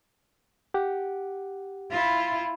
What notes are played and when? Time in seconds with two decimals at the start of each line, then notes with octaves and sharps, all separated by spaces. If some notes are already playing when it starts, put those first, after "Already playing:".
0.74 G4 F#5
1.91 E4 F4